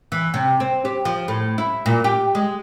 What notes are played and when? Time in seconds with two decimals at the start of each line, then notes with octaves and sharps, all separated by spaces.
0.12 E3
0.34 C3
0.60 C4
0.85 G4
1.05 F3
1.28 A2
1.58 E4
1.86 A#2
2.04 G4
2.35 G#3